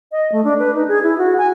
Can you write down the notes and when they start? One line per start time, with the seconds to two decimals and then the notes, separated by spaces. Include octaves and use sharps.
0.12 D#5
0.32 A3
0.44 D4
0.59 B4
0.74 D#4
0.88 G#4
1.03 E4
1.18 F#4
1.38 G#5